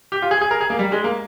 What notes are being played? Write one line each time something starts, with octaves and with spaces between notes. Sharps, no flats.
G4
F4
G#4
G#4
A#4
G#4
A#3
G3
G#3
A#3